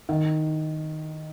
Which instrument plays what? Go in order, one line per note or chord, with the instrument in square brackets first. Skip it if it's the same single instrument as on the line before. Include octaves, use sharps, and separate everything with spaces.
[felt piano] D#3